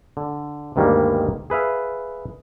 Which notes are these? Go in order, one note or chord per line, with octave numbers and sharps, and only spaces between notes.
D3
D2 G2 D#3 G3 G#3 A#3
G#4 B4 E5 F5